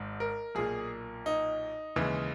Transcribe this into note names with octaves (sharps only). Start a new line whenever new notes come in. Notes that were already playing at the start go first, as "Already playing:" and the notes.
Already playing: G#1 G#2
A#4
B1 A#2 A#3 G#4
D#4
D#2 C#3 E3 G#3